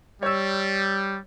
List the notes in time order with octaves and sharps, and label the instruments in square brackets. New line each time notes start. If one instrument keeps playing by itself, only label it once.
[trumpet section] G3 [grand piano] C#5 E6